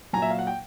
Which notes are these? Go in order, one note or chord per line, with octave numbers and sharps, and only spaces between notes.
A#2 F#3 G#5 A#5
E5
F5
F#5
G5